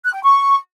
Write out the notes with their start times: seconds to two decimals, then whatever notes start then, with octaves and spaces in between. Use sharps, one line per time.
0.05 F#6
0.14 G5
0.23 C#6